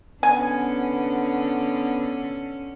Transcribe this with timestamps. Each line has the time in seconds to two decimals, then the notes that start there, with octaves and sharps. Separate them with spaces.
0.23 D3 B3 C#4 G#5